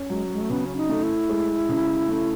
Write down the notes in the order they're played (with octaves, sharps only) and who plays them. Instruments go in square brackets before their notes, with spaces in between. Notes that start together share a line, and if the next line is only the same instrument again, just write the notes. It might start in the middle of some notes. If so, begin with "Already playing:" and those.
Already playing: [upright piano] C#4
[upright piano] F#3 [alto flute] G#3
[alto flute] G#3
A3
[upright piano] C#3 [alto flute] B3
[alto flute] C#4
D#4
[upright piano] A3
[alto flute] E4
[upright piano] G#3
C#3
A3